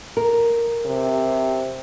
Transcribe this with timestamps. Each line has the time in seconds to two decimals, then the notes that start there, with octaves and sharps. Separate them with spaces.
0.17 A#4
0.86 C3